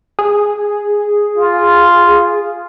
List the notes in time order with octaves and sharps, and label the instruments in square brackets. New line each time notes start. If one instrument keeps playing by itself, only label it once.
[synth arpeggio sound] G#4
[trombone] F4